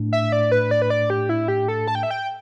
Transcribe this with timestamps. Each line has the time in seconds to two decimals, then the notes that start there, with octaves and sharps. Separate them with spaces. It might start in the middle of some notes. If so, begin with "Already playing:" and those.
Already playing: A2 A3 D4
0.13 E5
0.32 D5
0.52 B4
0.71 D5
0.82 B4
0.90 D5
1.10 G4
1.29 E4
1.48 G4
1.68 A4
1.88 A5
1.95 G5
2.03 E5
2.11 G5